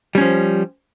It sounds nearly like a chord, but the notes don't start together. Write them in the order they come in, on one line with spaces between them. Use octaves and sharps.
G3 C#4 F3